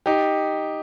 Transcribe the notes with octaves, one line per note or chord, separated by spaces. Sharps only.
D#4 G4